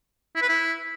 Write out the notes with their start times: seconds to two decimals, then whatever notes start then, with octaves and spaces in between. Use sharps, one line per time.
0.35 E4
0.42 B4
0.49 E4